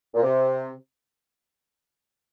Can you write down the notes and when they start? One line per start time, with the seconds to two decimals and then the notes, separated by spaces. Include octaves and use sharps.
0.14 A#2
0.22 C3